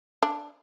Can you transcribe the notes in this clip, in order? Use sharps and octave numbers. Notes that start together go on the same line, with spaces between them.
D4